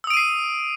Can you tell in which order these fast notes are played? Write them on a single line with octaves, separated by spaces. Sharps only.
E6 D#6 D7 D#7 C7